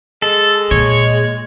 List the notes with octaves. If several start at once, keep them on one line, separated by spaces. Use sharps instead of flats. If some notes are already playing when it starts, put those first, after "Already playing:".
G#3 A4
A#2 C#5